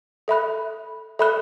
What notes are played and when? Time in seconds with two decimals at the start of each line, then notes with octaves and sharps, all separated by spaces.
0.28 A4 E5 B5 F#6
1.19 A4 E5 B5 F#6